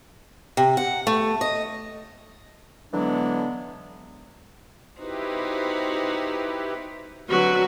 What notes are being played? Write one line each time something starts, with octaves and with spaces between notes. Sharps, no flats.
C3
F#5
A3
D#5
D3 E3 F#3 G#3 B3 D4
D#4 E4 F#4 G4 B4 C5
D3 F#3 C4 F#4 B4